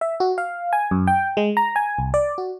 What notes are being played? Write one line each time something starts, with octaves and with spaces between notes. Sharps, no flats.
E5
F#4
F5
G#5
F#2
G5
G#3
A#5
G#5
C2
D5
F#4